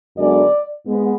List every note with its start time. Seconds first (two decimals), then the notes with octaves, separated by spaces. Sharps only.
0.17 F#2 D3 G#3 B3 D5
0.87 G#2 G#3 B3